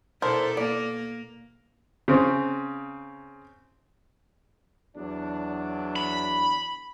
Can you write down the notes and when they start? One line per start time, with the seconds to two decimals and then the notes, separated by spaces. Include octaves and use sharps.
0.22 B2 D4 E4 A4 A#4 C5
0.57 A#3 D5
2.08 C#3 C4
4.96 E2 F#3 D4
5.96 B5